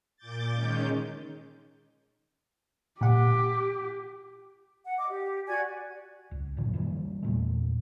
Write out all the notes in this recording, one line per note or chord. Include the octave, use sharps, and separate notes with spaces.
A#2 D6 G6 A6
D#3 G#3 C#4 G6
A#2 G4 F#5
F#5
D#5 D6
G4
F#4 D5 G#5 G#6
C#2
F#2 A#2 D3 E3
D#3 E3 G3 A#3
E2 A#2 A3